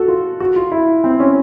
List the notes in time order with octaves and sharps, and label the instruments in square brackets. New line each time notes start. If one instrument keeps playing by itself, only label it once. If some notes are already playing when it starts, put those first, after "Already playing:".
Already playing: [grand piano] F#4 A4
F4
F#4
F4
E4
C4
C#4